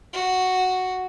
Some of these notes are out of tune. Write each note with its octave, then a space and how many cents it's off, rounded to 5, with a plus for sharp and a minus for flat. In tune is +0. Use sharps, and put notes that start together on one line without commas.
F#4 +0